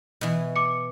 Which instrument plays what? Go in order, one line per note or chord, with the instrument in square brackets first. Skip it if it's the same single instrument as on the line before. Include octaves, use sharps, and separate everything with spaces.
[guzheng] B2 E3
[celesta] D6 C#7